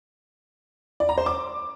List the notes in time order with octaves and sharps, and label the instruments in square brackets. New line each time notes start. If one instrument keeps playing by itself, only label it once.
[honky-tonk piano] D5
A#5
C5
D6